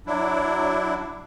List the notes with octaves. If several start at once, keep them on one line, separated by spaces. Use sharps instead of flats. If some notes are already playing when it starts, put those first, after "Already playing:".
F#3 D4 E4